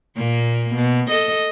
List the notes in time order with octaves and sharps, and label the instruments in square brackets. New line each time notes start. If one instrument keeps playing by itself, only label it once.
[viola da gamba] A#2 A#3
B2
A4 D#5